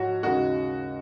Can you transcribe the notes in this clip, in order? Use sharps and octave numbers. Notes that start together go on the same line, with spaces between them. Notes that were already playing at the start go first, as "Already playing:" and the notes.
Already playing: G#2 F3 F#4 C#5
D#2 C#3 G#3 D#4 F#4